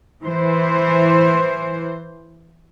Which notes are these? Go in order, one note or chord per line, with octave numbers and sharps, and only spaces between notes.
E3 C5